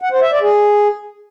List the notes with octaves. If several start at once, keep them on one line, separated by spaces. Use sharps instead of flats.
F#5
C5
E5
D5
G#4